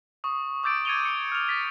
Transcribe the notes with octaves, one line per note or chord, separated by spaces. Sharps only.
C#6 D#6
D6 E6 G6 A6 D7
G#6 A6 C#7 D#7 F7 G7
C#7 D7
F6 F7
A6 B6 F7